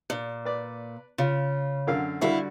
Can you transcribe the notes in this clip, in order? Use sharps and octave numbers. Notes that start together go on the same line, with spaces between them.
A#2
B4 D5
C#3 F4
F#2 D3 F5
D3 G3 E4 F#4 F5